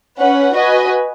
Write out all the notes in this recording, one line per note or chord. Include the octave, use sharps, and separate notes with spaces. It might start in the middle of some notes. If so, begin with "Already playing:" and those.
C#4 B4 F#5
F#4 B4 D#5 G#5